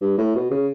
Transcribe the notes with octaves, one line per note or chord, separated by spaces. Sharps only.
G2
A2
B2
C#3